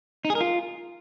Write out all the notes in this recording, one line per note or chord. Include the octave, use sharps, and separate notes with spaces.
D#4
G#4
A#4
F4